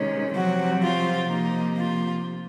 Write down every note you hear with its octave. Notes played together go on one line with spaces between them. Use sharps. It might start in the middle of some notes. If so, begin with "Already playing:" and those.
Already playing: C3 D#3 G#3 C#4
C3 F3 F#3 C4 F#4
F4
C3 F3 A#3 D#4
F4